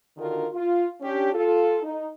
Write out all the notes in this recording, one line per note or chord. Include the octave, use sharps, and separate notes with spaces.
D3 D#3 D4 F4 F#4 A#4
F4
C#4 D4 G4
F4 A4
D#4